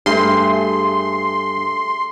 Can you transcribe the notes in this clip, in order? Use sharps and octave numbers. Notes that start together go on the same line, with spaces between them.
G2 A3 G#4 C6